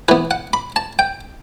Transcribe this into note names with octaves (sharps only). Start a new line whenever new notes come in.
E3 B3 B4
F#5
B5
A5
G5